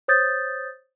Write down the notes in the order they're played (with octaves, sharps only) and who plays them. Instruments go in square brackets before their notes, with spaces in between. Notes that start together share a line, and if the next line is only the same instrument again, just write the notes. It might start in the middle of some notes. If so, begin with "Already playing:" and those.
[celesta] C5 C#5 D#6 G6 A6